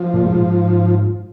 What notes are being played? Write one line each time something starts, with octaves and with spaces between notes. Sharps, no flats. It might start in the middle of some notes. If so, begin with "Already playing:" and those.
Already playing: F3
A#2
G#2